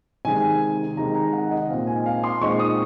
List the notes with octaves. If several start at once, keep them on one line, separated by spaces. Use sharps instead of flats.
C3 D#3 G#3 G#5
C3 D#3 G#3 A#5
A#5
F#5
D#5
A#2 G#3 C4 D#4 F5
G#5
F5
C6
A#2 G#3 C4 D#4 C#6
D#6